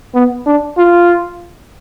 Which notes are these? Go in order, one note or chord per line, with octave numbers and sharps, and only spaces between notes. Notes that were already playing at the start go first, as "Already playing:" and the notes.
B3
D4
F4